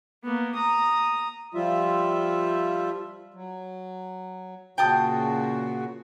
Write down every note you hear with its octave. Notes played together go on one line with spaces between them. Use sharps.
A#3 B3
A#5 D#6
F3 G3 F4 E5
F#3
A#2 C#3 F#4 G5 A5 D#6